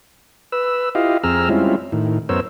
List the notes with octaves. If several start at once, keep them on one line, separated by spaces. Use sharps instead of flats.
B4 E6
E4 F4 G4 D#5 F5
F2 C4 G#4 A#5 E6 F6
G3 G#3 C4 C#4 E4 F4
A2 D#3
F#2 B3 A#4 C5 C#5 E6